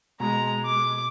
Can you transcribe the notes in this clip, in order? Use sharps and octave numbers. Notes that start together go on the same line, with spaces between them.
B2 G#3 A#5
D6